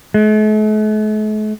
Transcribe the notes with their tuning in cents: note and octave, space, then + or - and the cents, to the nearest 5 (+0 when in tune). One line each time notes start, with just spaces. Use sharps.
A3 -45